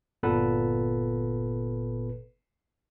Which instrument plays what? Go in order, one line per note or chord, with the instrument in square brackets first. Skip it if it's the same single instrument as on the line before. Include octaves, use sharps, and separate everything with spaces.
[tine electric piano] G1 A#2 B3 A4 B4